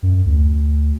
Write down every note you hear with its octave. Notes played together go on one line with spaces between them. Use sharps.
F#2
D2